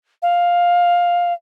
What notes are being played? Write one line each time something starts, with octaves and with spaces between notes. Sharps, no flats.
F5